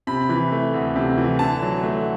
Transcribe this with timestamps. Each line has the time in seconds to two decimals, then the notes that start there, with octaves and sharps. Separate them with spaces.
0.07 C3 B5
0.29 E3
0.52 A3
0.74 D2
0.96 C3
1.18 E3
1.39 D3 A5
1.62 F#3
1.83 A3